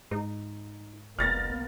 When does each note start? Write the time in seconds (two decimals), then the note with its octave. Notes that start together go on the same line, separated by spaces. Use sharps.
0.11 G#2 D#4
1.19 F1 C2 A#3 B3 F6 A6 A#6